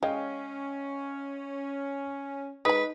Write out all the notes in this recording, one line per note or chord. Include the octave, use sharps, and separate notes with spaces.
G#3 C#4 D#5 F5 G5
G#3 D#4 B4 B5